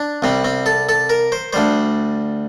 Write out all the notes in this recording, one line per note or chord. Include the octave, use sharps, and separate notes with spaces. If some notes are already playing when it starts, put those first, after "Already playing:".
Already playing: D4
C2 C3 G3 C4
C4
A4
A4
A#4
C5
D2 D3 G3 C5